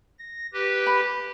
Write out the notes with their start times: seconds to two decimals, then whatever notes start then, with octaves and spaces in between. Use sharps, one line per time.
0.19 A#6
0.54 G4 B4
0.86 B5